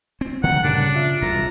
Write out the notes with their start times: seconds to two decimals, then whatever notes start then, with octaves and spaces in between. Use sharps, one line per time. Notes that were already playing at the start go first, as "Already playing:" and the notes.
0.21 C4
0.44 D3 F3 G#3 F#5 G5 A#5
0.64 G2 A#2 C#3 D4
0.95 F4 E5
1.22 E1 C2 A#2 A#5